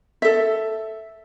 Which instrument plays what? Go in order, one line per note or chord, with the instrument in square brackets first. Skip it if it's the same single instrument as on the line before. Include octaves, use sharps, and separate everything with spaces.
[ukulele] A4 E5